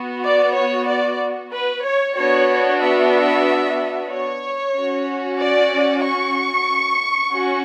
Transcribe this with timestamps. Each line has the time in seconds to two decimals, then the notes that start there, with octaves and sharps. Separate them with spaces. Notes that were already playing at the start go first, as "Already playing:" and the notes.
Already playing: B3 F#4
0.22 D5
0.54 C#5
0.87 D5
1.52 B4
1.84 C#5
2.17 B3 D4 F#4 C#5
2.81 E5
4.11 C#5
4.75 C#4 F#4
5.40 D5
6.04 C#6
7.34 C#4 F#4